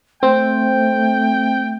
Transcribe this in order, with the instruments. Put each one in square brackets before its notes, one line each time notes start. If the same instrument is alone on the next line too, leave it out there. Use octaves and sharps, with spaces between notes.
[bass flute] A3 [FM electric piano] C4 [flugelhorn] G5